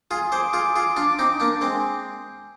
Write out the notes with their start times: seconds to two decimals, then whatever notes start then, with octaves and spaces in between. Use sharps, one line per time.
0.11 F4 G#4
0.32 G#4 C5 D6
0.53 F4 G#4
0.76 F4 G#4
0.97 D4 F4
1.19 C4 D#4
1.40 A#3 D4
1.61 G#3 C4